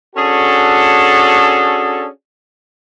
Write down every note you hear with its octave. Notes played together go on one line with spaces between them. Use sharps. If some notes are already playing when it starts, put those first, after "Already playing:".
C#4 D4 F#4 G#4 A4